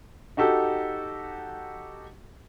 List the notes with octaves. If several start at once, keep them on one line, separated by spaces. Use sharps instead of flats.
D#4 F#4 G4 A4